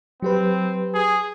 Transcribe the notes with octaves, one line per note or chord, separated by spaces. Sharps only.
F#3 C4 G4 B4
G#4